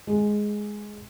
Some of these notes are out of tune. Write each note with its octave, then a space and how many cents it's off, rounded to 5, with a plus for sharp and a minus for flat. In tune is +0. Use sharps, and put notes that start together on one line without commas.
G#3 +5